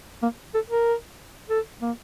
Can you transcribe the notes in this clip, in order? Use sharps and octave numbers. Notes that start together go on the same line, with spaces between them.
A#3
A4
A#4
A4
A#3